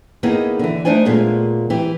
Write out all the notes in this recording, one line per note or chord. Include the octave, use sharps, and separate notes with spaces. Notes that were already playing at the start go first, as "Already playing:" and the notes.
D#3 A#3 B3 D#4 E4 G#4
D3 E3
A3 D4 D#4 C5 D5 G#5
D#2 A#2 G#3 A3 B3
E3 G4